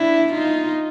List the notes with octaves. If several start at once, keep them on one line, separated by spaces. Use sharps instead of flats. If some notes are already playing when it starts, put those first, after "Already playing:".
Already playing: D4 E4
D#4 F4